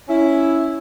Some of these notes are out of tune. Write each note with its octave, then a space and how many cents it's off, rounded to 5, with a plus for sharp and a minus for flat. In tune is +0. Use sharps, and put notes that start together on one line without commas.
C#4 +0 E4 +0